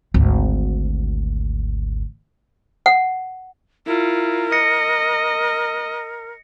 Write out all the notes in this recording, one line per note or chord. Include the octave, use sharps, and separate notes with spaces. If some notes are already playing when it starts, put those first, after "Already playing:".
G#1 D2
F#5
E4 F4 A#4
D#5 A#6 C#7